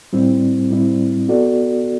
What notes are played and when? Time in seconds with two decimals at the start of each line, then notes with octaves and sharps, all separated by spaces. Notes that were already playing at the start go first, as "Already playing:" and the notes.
0.13 A2 G3 C4 E4
0.70 A2 G3 C4 E4
1.28 B3 F#4 A4 D5